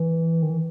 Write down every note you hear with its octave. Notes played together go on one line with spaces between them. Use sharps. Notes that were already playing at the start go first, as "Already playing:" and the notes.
Already playing: E3
D#3
E3